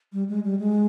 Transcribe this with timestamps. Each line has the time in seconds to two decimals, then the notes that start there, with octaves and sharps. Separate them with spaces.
0.13 G3
0.29 G#3
0.44 G3
0.59 G#3